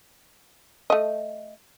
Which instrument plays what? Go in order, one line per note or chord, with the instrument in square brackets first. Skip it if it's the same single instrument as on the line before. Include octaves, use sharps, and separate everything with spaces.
[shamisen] A3 D#5